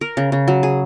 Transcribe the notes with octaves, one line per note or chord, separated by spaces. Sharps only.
A#4
C#3
C#3
F#3
G#4